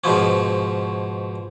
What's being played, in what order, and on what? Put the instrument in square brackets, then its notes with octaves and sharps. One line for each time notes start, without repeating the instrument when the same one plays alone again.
[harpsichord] G#2 B2 F3 C#4